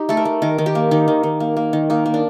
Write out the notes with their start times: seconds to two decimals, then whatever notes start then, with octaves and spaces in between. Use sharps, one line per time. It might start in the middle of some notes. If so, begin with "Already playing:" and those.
Already playing: D#4 G4
0.09 A3 A4
0.17 A#4
0.25 A3
0.42 D#3 A#4
0.58 D#3
0.66 G4
0.75 A#3
0.91 D#3 D#4
1.08 D#3
1.23 D#3
1.40 A#3
1.57 A#3
1.73 D#3
1.90 A#3 D#4
2.06 A#3
2.14 D4